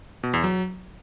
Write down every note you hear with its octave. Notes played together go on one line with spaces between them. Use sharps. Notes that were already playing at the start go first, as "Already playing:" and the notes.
B2
E2
F#3